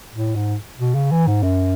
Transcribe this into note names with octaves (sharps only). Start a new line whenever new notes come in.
A2
G#2
B2
C#3
E3
G#2
F#2